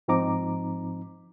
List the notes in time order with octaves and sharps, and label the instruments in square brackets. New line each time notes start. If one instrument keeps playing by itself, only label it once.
[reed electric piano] G#2 F3 C4 D#4 A#5 D6